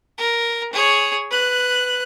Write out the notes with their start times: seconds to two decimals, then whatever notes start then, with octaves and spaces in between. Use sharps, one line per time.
0.18 A#4
0.72 G#4 C#5
1.30 B4 F#6